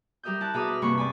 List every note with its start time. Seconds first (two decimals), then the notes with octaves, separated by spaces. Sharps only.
0.23 G3 G4 A#4 E5 D#6 G6
0.40 E4 A5 F#6
0.54 B2 G#4 E5 A#5 D6 D#6
0.68 B4 F6
0.82 E2 G2 C3 A#3 B5 C#6
0.97 C4 D5 G#5 B5